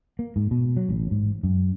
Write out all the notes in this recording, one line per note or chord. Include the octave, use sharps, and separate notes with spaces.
A#3
G#2
B2
F#3
A1
G#2
F#2